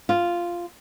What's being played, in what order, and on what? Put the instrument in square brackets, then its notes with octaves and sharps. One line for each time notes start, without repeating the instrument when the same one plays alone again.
[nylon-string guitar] F4